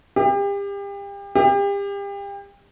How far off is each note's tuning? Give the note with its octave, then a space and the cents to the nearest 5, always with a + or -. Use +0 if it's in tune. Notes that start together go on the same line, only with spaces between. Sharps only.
G4 +35
G4 +35